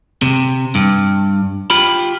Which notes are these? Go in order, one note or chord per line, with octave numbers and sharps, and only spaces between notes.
C3
G2
F4 G4 B5